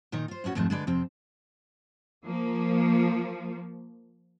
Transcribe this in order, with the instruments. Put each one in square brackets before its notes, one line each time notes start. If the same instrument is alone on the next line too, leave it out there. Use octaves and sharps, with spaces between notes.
[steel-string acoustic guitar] A#2 D#3 D#4
F4 C5
A2 B3 C#4 F#4
F2 G#2 B2 D#3 G#3 A3
D3 G#3 B4 D5
F2 C3 C4
[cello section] F3 A#3